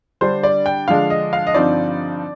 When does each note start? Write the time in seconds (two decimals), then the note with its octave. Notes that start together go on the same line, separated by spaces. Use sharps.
0.21 D3 G3 D4 C5
0.43 D5
0.66 G5
0.88 D3 F3 G#3 D4 F5
1.10 D#5
1.33 F5
1.47 D#5
1.54 G2 D3 F3 C4 D#4 D5